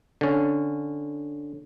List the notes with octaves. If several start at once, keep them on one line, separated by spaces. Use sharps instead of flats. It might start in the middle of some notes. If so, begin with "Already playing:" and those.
D3 C#4